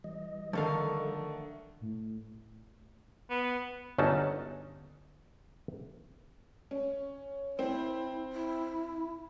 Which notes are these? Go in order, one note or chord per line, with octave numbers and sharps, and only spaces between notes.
E3 G3 D#5
D3 D#3 F3 A3 A4 F5
A2
B3
G1 F#3 C#4 D#4 A5
C#4
C4 E4
E4